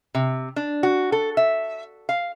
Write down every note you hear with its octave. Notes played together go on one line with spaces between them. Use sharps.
C3
D4
F#4
A4
E5
F5